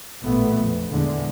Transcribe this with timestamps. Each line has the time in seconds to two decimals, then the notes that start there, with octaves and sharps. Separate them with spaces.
0.23 A1 A#2 A3 B3
0.55 A#1 F2
0.90 E2 A#2 D3 G#3